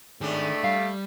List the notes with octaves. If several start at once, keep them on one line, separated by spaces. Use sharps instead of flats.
A2 D#3 G#3 A3 D4 G#4
G3 F5